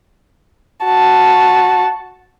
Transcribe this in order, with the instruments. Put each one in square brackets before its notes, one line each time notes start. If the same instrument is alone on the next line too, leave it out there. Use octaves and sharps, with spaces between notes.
[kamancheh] F#4 A5